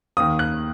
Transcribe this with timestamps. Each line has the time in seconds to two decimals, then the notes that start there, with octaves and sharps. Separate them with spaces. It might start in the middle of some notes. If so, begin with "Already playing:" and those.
0.17 D#2 D#3 D#6
0.39 F#6